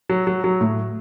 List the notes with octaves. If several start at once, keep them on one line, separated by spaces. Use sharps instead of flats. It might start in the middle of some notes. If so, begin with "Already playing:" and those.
F#3
F#3
F#3
A2